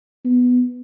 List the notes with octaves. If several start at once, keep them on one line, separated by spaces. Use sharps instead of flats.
B3